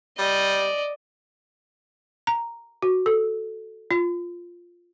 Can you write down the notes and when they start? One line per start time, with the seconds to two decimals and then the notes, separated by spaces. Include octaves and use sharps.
0.18 G3 D5 D#5
2.27 A#5
2.82 F#4
3.06 A4
3.91 F4